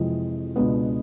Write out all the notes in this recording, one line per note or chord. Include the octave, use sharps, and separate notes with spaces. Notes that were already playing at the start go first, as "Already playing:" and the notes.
Already playing: F2 C3 E3 G#3
C#2 B2 G#3 B3 D4